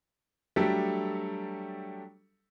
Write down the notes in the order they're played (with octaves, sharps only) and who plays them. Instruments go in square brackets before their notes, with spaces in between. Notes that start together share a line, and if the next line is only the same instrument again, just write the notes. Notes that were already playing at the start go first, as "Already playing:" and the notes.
[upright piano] F#3 G3 A3 D4 G4 A4